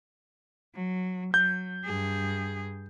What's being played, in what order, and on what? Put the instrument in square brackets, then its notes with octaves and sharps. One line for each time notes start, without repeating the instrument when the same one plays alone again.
[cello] F#3
[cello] F#3 [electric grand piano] G6
[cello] G2 G#4